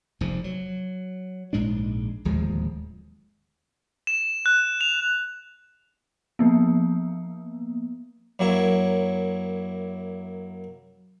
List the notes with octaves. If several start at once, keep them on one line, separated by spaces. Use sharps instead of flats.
F1 G#2 F3
F#3
A#1 G#2 G#3 D4
D1 D#2 F3 G#3
E7
F#6
F7
F3 A#3 B3
F#2 F#3 A#3 E4 C#5 C#6